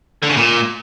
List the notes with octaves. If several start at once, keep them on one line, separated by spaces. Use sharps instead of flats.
D3
C#3
A#2